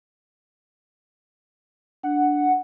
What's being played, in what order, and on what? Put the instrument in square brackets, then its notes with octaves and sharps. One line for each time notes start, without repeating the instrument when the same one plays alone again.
[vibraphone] D4 [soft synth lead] F#5